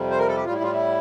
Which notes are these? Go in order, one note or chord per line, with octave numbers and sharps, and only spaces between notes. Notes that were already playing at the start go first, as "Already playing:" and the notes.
Already playing: F2 C3 G3
C5
A#4
A4
G4
A2 G3 F4
E4
F4
E4